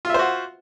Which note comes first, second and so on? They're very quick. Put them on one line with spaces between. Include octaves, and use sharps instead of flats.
F4 E5 C5 F#4